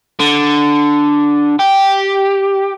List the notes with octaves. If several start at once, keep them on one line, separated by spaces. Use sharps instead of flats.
D3
G4